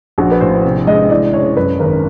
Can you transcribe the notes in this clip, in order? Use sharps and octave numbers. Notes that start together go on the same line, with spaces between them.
A#1 F#4
B4
A2 C5
C3
G#3 D#5
E3 D5
F#1 C#5
F#2 B4
G#1 A#4